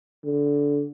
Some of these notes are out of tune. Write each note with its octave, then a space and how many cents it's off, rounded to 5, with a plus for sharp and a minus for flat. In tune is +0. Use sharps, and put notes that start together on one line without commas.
D3 -20